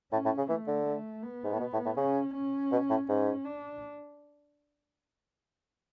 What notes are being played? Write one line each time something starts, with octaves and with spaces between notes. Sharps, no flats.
A2 C#4
A2
C#3
E3 A3
D3
A3
B3
G#2
A2
B2
A2
A2
C#3 C#4
C#4
B2
A2
G#2 C#4
D4